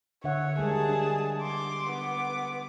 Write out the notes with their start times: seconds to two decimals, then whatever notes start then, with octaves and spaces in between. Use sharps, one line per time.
0.24 D3 C#5 E5 F#5
0.59 G3 G#3 G#4 A#4 A5
0.89 D4
1.41 C6 D6
1.90 B3 D6